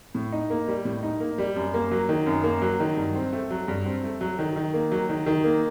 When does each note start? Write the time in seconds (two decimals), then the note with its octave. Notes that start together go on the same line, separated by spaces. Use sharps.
0.15 A2
0.32 D#4
0.50 A#3
0.68 G3
0.85 A2
1.03 D#4
1.20 A#3
1.38 G3
1.56 F#2
1.74 A#3
1.91 F#3
2.09 D#3
2.26 F#2
2.44 A#3
2.62 F#3
2.80 D#3
2.97 G2
3.15 C4
3.33 A3
3.50 F#3
3.68 G2
3.86 C4
4.03 A3
4.21 F#3
4.39 D#3
4.56 D#3
4.74 A#3
4.92 F#3
5.09 D#3
5.26 D#3
5.44 A#3